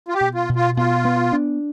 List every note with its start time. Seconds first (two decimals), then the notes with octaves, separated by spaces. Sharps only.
0.08 F4
0.14 G4
0.21 B2
0.35 F4
0.49 B2
0.56 F4
0.77 B2 F4
1.05 B3
1.33 D4